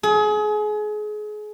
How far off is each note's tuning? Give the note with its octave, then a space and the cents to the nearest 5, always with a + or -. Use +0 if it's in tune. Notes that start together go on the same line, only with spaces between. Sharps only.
G#4 +30